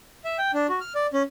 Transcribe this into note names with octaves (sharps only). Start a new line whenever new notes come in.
E5
G5
D4
F#4
F6
D5
C#4